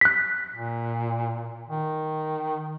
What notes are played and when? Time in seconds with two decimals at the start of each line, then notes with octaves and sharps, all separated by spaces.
0.01 F#6 B6
0.52 A#2
1.69 D#3